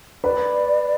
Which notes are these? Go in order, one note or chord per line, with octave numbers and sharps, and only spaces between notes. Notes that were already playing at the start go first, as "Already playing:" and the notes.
B4 D5